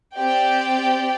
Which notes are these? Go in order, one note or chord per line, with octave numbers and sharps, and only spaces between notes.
C4 G4 D5 G5